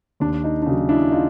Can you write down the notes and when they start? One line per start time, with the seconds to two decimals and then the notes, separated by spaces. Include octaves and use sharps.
0.20 D#2 D4
0.44 D#4
0.62 D4
0.66 C#3 D#4
0.71 F#3
0.89 D4 E4
1.12 D#4 F4